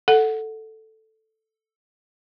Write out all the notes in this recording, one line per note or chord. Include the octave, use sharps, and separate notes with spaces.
A4 F#5